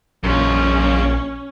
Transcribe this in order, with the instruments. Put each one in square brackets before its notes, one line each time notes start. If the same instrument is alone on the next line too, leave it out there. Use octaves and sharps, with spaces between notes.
[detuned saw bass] A#1 [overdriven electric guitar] F#2 F4 [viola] C#4